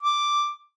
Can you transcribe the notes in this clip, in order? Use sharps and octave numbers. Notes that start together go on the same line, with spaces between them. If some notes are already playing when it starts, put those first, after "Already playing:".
D6